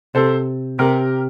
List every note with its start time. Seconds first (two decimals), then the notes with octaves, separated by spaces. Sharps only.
0.15 C3 A4 C5
0.79 C3 G4 A#4